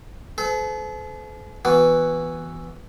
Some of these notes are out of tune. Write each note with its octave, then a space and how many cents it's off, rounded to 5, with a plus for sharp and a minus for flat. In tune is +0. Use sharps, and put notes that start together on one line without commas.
A4 -45 C5 -45
E3 +0 B3 +0 F#4 +0